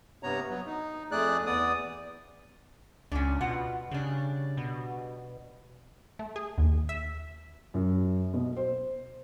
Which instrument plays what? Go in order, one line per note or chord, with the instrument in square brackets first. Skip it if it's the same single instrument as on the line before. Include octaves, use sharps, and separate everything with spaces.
[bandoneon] G2 C3 B3 C#5 A#5
F#3 B3
D#4
F2 A3 G#4 D5 F#6
E2 B3 D5 D#6
[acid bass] C#2 [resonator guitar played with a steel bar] C#4 D4
[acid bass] B2 [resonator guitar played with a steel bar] F4 F#5
[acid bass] C#3 [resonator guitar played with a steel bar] G3 D4
[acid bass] B2
[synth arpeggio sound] A3
G#4
D#2
E5
[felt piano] F#2
B2
C5